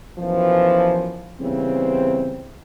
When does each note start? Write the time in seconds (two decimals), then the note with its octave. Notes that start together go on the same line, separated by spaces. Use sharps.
0.19 F#2 B2 E3 F3
1.41 C#3 E3 G3 B3 C4